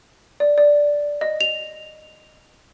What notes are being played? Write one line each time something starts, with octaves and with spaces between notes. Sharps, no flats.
D5
D5
D#5
F7